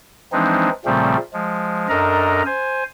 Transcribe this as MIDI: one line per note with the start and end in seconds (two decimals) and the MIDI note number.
0.32 0.70 52
0.32 0.70 53
0.32 0.70 56
0.32 0.70 60
0.32 0.70 62
0.32 0.70 63
0.85 1.17 46
0.85 1.17 49
0.85 1.17 53
0.85 1.17 55
0.85 1.17 57
0.85 1.17 60
1.33 1.88 53
1.33 1.88 56
1.89 2.42 42
1.89 2.42 62
1.89 2.42 69
1.89 2.42 70
1.89 2.42 75
1.89 2.42 82
2.46 2.83 72
2.46 2.83 80